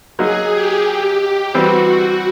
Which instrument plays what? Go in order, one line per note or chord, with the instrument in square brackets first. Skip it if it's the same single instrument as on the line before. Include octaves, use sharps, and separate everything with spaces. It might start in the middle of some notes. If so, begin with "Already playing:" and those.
[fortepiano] F#3 A#3 D#4 [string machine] G#4
[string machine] G4
[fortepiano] E3 G3 C4 [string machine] F#4